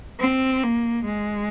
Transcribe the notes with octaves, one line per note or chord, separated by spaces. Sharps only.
C4
A#3
G#3